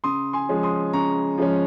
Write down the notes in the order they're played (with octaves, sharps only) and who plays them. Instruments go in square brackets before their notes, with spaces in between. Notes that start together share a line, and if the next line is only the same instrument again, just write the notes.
[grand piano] C#3 C6 D#6
G#5 C6
F3 G#3 C#4
C6 D#6
C#3 A#5 C#6
F3 G#3 C#4